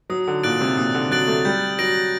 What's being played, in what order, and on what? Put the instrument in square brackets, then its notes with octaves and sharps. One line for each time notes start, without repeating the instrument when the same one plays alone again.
[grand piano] F#3 [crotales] D#6
[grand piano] D3
[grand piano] A#2 [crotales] F#6 A6 D7 F#7
[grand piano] C3
[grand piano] A#2 [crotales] D#6
[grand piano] D3
[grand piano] F#3 [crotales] F#6 A6 D7 F#7
[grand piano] A3
[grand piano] G3 [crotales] G6
[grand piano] F#3 [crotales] A#6 D7 F#7